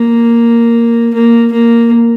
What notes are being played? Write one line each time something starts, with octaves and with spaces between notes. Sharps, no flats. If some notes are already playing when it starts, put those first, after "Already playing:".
Already playing: A#3
A#3
A#3